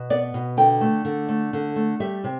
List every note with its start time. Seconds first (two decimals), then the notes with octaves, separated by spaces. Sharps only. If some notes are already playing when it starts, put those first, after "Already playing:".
Already playing: B2
0.10 B3 D5
0.34 B2
0.57 D3 G5
0.81 A3
1.05 D3
1.29 A3
1.53 D3
1.76 A3
2.00 G3 E5
2.24 C3